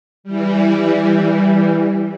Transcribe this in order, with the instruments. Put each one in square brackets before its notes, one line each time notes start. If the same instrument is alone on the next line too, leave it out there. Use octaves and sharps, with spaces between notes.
[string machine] E3 G3